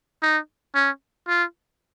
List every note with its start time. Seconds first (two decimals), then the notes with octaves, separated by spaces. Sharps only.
0.22 D#4
0.75 C#4
1.28 F4